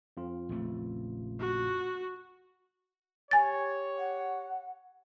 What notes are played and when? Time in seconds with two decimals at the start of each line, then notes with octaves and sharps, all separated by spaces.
0.17 F2 F4
0.49 A#1 C#3 A3
1.40 F#4
3.31 G4 C#5 G#5 A6
3.99 F#5